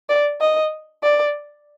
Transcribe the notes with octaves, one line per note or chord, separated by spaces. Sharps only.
D5
D#5
D5